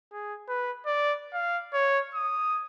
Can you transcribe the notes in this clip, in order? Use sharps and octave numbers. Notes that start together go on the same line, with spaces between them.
G#4
B4
D5
F5
C#5
D#6